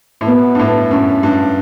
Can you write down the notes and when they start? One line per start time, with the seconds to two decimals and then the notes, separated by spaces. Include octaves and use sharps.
0.21 A2
0.27 B2 B3
0.55 G2
0.59 A2
0.91 F#2
1.23 G2